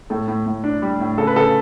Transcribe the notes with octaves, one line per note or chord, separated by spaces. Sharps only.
A2 A4
A2
A2
D4
G3
A2
C#3 A4
B4
C#3 A4